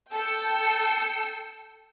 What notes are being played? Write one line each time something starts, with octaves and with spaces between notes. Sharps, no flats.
A4 G5 E6 C#7